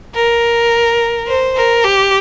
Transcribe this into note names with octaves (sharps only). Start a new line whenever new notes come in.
A#4
C5
A#4
G4